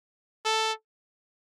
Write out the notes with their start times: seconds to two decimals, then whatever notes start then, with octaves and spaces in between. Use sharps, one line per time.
0.45 A4